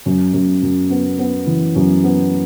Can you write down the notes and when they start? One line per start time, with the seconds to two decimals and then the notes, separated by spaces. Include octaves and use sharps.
0.06 F#2
0.33 F#2
0.62 F#2
0.90 B3
1.19 B3
1.47 E3
1.75 F#2
2.04 B3